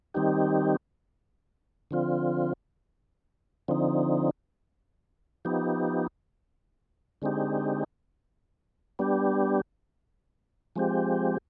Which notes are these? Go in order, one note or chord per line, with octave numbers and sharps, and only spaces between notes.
D#3 G3 C4 D#4 G4
D3 F3 C4 F4
D3 F3 C4 D#4
F3 B3 D#4 G4
D3 G#3 C4 D#4 G4
G3 B3 D4 G4
F3 G#3 C4 G4